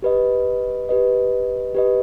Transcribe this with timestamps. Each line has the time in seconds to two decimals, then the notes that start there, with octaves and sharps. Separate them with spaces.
0.02 G4 B4 D#5
0.89 G4 B4 D#5
1.75 G4 B4 D#5